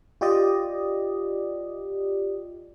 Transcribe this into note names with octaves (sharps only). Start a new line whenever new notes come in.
F4 G4 D5 D#5